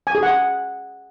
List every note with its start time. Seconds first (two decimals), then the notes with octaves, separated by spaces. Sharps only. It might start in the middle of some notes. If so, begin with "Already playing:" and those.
0.07 G#5
0.15 G#4
0.23 F#5